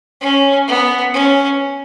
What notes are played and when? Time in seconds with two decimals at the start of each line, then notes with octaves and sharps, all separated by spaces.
0.21 C#4
0.68 B3
1.14 C#4